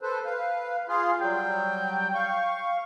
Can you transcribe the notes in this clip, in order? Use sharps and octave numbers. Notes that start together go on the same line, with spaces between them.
A4 B4 C5
B4 F5
F4 G#4 F5
F#3 G3 G5
F5 C#6